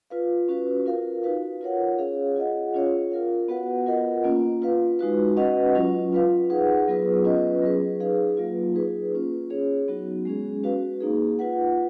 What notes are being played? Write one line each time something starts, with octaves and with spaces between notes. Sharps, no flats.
F4 B4 F5
C#4 F#4 B4
F4 A#4 F5
D#4 F#4 B4 F5
F4 A#4 C#5 F#5
C#4 G#4 C#5 F5
F4 G#4 D#5 F#5
C#4 F4 G#4 C#5 F5
F4 A#4 F5
B3 F#4 B4 F#5
F4 A#4 D#5 F#5
A#3 C#4 F4
F4 B4 F5
G#3 D#4 F#4 B4
C#4 F#4 B4 D#5 F#5
F#3 C#4 F4
F4 B4 F5
D#4 G#4 B4 F#5
F#3 B3 F4 G#4 B4
C#4 F4 B4 D#5
F#3 C#4 G#4 B4
D#4 G#4 B4 F5
F#3 A#3 F4
D#4 G#4 B4
A#3 C#4 F4
C#4 G#4 C#5
F#3 B3 D#4 F#4
G#3 C#4 G#4
C#4 F#4 B4 F5
A#3 D#4 G#4
F4 B4 F#5